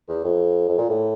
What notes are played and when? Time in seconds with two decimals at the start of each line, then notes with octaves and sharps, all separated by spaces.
0.08 E2
0.24 F2
0.69 F2
0.78 A#2
0.89 A2